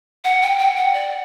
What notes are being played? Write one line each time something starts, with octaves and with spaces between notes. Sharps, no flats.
F#5
G5
G5
F#5
D5